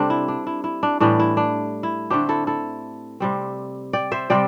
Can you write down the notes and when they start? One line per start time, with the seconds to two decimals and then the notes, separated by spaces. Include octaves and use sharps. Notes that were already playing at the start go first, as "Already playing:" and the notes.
Already playing: C3 G3 C4 D4 G4 A4
0.10 E4
0.28 D4
0.47 E4
0.64 E4
0.83 D4
1.00 A2 E3 G3 D4
1.19 E4
1.37 D4
1.83 E4
2.10 D3 A3 C4 D4 G4
2.29 E4 A4
2.47 E4 A4
3.20 C3 G3 C4
3.93 D5 G5
4.12 C5 E5
4.30 C3 G3 C4 D5 G5